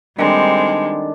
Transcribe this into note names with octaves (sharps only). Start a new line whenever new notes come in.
D#3 G3 G#3 C4 D4 A4